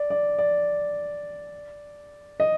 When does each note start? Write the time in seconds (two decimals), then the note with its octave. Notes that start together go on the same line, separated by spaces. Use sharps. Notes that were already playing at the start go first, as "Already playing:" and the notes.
Already playing: D5
0.10 D5
0.39 D5
2.40 D#5